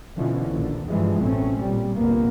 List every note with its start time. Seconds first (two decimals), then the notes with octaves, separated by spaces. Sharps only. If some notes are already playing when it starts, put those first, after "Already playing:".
0.16 B2 D3 E3 F3 C#4
0.49 A#1 D#2 D3
0.87 G2 E3 F3 G3 G#3
1.21 A1 B2 A3 C4 C#4
1.58 A#2 G3
1.95 F1 A#1 A#2 A#3 B3